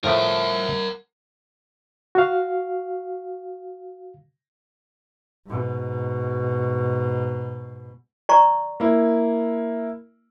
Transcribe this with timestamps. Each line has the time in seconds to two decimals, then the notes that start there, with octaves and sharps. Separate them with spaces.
0.04 A2 F3 A3 A#4 F#5
2.15 F#4 F5
5.48 G#2 B2
8.29 D5 A#5 C#6
8.80 A#3 E4